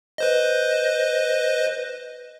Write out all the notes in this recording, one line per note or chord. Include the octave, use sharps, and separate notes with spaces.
B4 C5 D#5